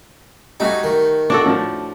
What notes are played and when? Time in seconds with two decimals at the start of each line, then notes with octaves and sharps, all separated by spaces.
0.60 G3 A3 D#4 F#4 G#5
0.83 D#3
1.30 D4 F#4 A4
1.46 A2 F3